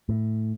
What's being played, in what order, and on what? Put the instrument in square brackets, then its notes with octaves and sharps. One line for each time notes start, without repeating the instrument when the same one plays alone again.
[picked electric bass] A2